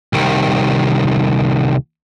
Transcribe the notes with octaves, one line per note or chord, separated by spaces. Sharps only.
C2 D#3